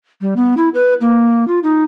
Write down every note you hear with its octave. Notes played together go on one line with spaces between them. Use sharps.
G3
B3
E4
B4
A#3
F4
D#4